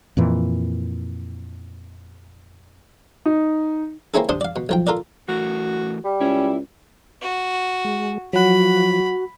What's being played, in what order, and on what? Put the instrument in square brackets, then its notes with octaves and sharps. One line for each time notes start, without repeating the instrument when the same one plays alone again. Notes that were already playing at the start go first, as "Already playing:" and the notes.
[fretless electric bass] F2 A#2 E3
[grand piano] D#4
[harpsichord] A#3 C4 C#4 E4 G#4 A4
C3 D4 C5 A5 D#6
D5 F5
B2
B1 F3 G5
F4 A4 A#4 D5
[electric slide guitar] E3 A3 A#4 [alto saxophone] F#4
[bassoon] G3
[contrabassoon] C#2 [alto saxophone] C#4 [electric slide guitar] E4
[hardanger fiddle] F#4
[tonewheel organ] G#3
[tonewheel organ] F3 [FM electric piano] F#3 F#5 [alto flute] F#4 [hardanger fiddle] B5